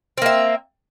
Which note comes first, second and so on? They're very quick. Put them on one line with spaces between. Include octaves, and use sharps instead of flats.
C4 A#3 E5